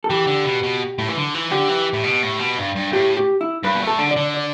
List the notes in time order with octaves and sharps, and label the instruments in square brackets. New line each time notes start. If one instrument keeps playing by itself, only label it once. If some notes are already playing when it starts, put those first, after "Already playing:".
[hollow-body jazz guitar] A4
[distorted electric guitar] E3 [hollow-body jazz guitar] G4
[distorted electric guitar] D3
B2
B2
A2
E3
D3
E3
[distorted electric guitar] D3 [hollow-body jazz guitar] G4
[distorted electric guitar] E3
A2
B2
A2
B2
G2
G2
[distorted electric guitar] A2 [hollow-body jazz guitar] G4
[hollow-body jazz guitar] G4
E4
[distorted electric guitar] G2 [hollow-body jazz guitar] B4
[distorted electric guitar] B2
A2
[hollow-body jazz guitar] A4
[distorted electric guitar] D3
[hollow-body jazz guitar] D5
[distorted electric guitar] D3
[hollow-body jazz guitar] D5